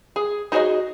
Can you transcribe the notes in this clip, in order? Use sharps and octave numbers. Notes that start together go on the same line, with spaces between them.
G#4
D#4 F#4 G#4 D5 D#5